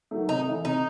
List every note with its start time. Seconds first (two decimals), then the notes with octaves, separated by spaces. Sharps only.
0.11 D#3 F#3 A3
0.29 C3 D#4
0.47 E3 A3
0.65 C3 D#4